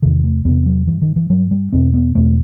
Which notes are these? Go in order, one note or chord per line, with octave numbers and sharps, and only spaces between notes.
E2 C3 D#3
A3
E2 C3 B3
F#3
G2 E3
D#3
E3
G2 F#3
G3
E2 B2 C4
B3
E2 B2 A3